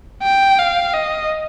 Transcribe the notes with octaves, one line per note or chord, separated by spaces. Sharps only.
G5
F5
D#5